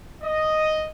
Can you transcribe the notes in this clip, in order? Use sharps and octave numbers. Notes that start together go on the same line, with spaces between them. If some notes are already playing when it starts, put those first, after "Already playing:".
D#5